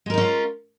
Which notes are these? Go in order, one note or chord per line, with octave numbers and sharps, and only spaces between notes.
G#3 C#4 D#4 F4 A#4